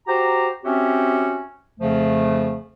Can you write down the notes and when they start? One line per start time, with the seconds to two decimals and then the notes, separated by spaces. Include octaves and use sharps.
0.07 F#4 G4 C5 A#5
0.64 C4 C#4 F#4 G4 C#5 E5
1.79 F2 C#3 F3 A3